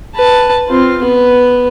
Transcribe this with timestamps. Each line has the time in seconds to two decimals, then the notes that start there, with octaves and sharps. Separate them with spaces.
0.16 B4 A5
0.68 C4 F4
1.02 B3 B4